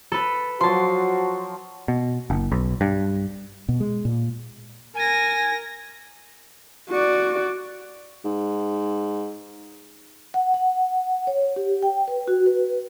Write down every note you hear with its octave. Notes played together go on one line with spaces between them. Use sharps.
A4 B4
F3 F#3 F#4 A5 C6
B2
F#1
B1
G2
B2
G#3
A#2
A#4 G#5 A#6
F#4 D5
G#2
F#5
F#5
C#5
G4
G5
B4
F#4
B4